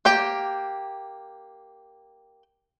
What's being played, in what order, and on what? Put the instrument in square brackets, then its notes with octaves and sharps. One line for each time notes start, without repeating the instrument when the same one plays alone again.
[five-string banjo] A#3 G4 G5